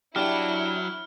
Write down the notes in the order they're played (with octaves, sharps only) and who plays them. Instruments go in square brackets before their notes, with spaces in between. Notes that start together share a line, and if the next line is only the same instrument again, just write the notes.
[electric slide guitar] F#3 [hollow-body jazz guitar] D4 G4 [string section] E4 [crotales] F6